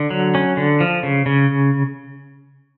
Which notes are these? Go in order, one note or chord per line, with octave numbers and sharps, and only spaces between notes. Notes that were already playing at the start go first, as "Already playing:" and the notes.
Already playing: D3
F#3
C#4
D3
F3
C#3
C#3